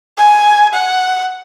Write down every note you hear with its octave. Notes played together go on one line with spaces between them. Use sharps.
G#5
F#5